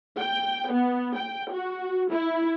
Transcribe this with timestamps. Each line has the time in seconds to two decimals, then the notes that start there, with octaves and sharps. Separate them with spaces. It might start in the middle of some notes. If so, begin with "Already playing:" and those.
0.18 G5
0.71 B3
1.16 G5
1.52 F#4
2.11 E4